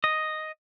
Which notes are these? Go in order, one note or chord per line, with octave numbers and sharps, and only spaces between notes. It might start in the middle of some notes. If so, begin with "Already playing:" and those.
D#5